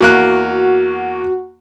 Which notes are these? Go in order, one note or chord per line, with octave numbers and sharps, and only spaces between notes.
E2 A#3 F#4 F#6